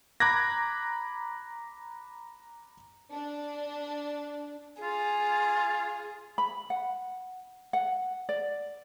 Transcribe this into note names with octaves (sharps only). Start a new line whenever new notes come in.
A#5 B5 D6 F#6 G#6 A#6
D4
F4 G#4
B5
F#5
F#5
D5